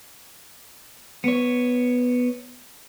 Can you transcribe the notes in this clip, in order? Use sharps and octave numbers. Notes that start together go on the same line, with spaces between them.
B3 C#5